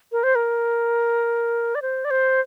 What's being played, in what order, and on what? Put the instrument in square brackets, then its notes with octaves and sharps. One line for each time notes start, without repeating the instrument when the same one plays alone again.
[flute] A#4
C5
A#4
D5
C5
D5
C5